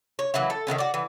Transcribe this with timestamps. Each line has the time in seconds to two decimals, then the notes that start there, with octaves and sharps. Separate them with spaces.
0.19 C#5
0.34 E3 F#3 A#3 E4
0.50 A4
0.67 D#3 A3 B3 C#4
0.78 F#4 D5
0.94 E3